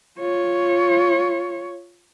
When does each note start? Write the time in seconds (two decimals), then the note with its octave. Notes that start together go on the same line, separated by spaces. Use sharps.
0.19 F4 C#5